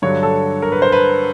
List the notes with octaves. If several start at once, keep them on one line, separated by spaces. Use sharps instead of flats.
G2 D3 F#3 C#5
A4
A#4
B4
C5
B4